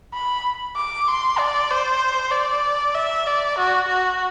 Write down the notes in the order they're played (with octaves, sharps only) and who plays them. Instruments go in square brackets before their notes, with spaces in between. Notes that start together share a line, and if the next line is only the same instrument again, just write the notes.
[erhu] B5
D6
C6
D5
C5
D5
E5
D5
F#4
F#4